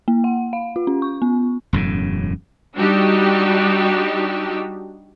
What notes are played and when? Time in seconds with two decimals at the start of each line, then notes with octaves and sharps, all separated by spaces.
0.08 A#3
0.24 F#5
0.53 F5
0.76 F4
0.87 C#4
1.02 C#6
1.22 B3
1.73 E1 F#2 A2 C#3
2.77 G3 D4 D#4 F#4 G4 E6